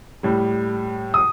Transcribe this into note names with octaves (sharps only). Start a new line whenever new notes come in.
A2 G3
D#6